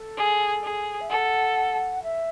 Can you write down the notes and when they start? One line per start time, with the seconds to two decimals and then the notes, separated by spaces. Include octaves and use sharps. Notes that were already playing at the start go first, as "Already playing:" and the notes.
Already playing: A4
0.17 G#4
0.63 G#4
1.00 E5
1.09 A4 F#5
2.03 E5